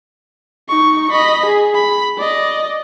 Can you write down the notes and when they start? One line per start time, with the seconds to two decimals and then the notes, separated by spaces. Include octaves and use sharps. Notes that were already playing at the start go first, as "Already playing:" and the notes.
0.68 D#4 C#6
1.11 D#5 B5
1.45 G#4
1.75 B5
2.18 D5 D#5